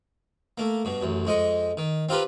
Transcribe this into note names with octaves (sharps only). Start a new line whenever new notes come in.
A3 A#3
G2 B2
A1 F#2
F2 G#3 D#5 C#6
D#3
C4 F4 G4 A#4 B4